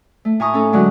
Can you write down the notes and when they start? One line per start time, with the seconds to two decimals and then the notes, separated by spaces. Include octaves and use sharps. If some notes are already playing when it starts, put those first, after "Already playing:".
0.25 A3
0.40 A2 G#5 A#5 C#6 D#6
0.54 C#4 D#4 A4
0.72 G#2 D3 F#3 G#3 C#4 F#5